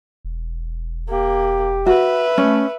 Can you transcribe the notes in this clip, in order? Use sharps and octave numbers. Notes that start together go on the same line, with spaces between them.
E1
A#3 G4
F#4 B4 E5
A3 C#4